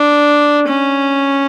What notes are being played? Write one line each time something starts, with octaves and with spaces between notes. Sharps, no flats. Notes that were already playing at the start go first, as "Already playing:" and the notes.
Already playing: D4
C#4